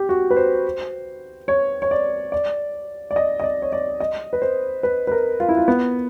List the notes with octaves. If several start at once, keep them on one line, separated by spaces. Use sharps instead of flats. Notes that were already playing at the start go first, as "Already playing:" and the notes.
Already playing: G4
F#4
B4
C5
C#5
C#5
D5
D5
D5
D#5
D#5
D5
C#5
D5
D#5
B4
C5
B4
B4
A#4
F4
E4
F4
B3